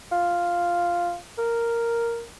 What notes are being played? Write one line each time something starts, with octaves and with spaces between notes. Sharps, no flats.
F4
A#4